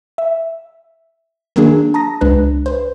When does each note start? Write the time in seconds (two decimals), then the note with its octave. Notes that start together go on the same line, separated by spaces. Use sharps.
0.18 E5
1.56 D#3 F#3 A#3 D4 G#4
1.94 A5 A#5 D#6 A#6
2.21 C#2 G#3 D4 B4 F#6
2.66 B4 C5